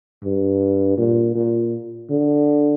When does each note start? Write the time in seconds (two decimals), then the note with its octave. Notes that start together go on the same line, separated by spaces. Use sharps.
0.24 G2
0.98 A#2
1.35 A#2
2.10 D3